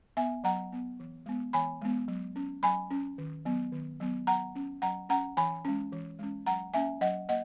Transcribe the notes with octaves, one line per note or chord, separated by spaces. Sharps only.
B3 E5 G#5
F#3 F#5 A#5
B3
E3
G#3 B3
E3 G#5 B5
G#3 B3
F#3
C#4
F#3 G#5 B5
C#4
D#3
F#3 B3
D#3
F#3 B3
F#3 F#5 A#5
C#4
F#3 F#5 A#5
C#4 F#5 A#5
E3 G#5 B5
G#3 C#4
E3
G#3 C#4
F#3 F#5 A#5
A#3 C#4 E5 G#5
F#3 D#5 F#5
A#3 D#5 F#5